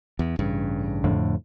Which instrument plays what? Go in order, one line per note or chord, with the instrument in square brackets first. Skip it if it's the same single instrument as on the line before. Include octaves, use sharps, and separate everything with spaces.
[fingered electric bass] E2
A1 G2 C#3
[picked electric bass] F2 A2 D3